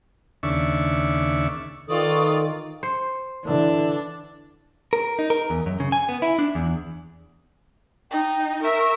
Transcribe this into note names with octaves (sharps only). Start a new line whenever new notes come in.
D#2 C#3 D4 E5 C#6
D#3 F4 A4 B4 D5 C#6 D#6
C5
D3 E3 D4
A#4
D#4
A#4
E2
F#2
C#3
G#5
B3
E4
D4
E2
D#4 G5
A#4 E5 C#6